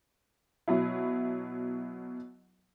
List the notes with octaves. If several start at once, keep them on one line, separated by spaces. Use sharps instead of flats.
B2 F#3 E4